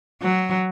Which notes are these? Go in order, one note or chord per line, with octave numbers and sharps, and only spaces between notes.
F#3